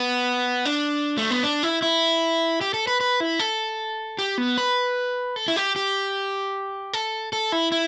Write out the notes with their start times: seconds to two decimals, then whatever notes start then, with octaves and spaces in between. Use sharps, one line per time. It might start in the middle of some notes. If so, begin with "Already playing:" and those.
Already playing: B3
0.65 D4
1.17 A3
1.31 B3
1.43 D4
1.63 E4
1.82 E4
2.61 G4
2.74 A4
2.87 B4
3.01 B4
3.20 E4
3.39 A4
4.19 G4
4.38 B3
4.58 B4
5.36 A4
5.48 E4
5.56 G4
5.76 G4
6.93 A4
7.33 A4
7.52 E4
7.72 E4